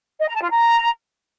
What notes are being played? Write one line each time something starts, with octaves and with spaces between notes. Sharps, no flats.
D#5
A#5
A5
F4
A#5